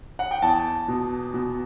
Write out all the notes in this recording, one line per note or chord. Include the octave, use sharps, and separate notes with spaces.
F#5
G5
E2 A5
B2
B2